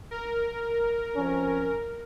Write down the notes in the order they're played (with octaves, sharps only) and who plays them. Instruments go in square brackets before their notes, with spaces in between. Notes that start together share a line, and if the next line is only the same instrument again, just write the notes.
[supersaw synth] A#4
[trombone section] F2 C#4